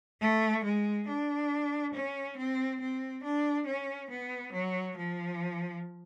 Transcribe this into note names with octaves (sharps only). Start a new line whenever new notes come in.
A3
G#3
D4
C#4
C4
C4
D4
C#4
B3
F#3
F3